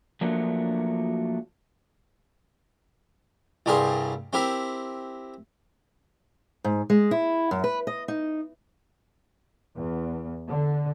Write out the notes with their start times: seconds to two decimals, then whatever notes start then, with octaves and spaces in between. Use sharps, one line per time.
0.21 F3 F#3 A3 A#3 D4 F#4
3.66 C2 G2 G4 G#4 A#4 C6
4.33 C4 E4 G4 A#4 B5
6.64 G#2
6.90 G#3
7.11 E4
7.51 F#2
7.64 B4
7.87 D#5
8.08 D#4
9.77 E2
10.48 D3